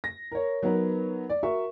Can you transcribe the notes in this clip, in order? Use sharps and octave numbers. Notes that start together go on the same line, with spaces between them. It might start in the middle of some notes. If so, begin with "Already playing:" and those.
A#6
A#4 C#5
F#3 B3 D#4 A#4 B4
D5
F#4 A#4 E5 C#6